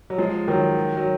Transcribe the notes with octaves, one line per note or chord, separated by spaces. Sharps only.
F#3
F3 G#3
D#3 F#3
F#3